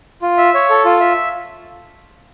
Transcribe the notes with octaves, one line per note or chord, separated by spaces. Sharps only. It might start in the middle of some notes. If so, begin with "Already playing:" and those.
F4
E5
C#5
A4
F4
E5